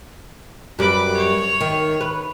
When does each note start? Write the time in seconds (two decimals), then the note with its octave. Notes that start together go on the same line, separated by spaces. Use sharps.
0.79 F#2 G3 B4 D6
1.17 C#5
1.61 D#3
2.01 B4